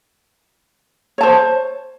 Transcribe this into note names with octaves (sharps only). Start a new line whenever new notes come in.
C5 C#5 A5